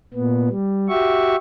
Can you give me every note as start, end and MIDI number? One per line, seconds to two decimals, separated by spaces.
0.14 0.49 46
0.14 0.49 59
0.49 0.88 55
0.89 1.36 66
0.89 1.36 67
0.89 1.36 76
0.89 1.36 85